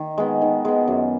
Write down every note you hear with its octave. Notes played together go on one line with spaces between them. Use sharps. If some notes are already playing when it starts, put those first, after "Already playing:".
Already playing: D#3
G#3 B3
D#3
G#3 B3
F#2